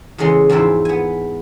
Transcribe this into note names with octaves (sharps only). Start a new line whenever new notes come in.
E2 C#3 E3 G#3 C#4 C6
E2 G#2 F3 C4 E4 C#5
B3 G#5